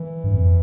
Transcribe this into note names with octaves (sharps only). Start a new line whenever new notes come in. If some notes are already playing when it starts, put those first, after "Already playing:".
Already playing: E3
G2
F2